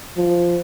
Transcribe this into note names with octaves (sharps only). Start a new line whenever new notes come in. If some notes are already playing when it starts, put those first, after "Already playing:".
F3